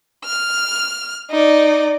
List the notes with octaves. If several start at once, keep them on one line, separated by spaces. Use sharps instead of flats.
F6
D#4 D5